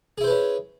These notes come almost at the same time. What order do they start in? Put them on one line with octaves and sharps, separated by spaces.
G#4 E4 C5 B4 C#4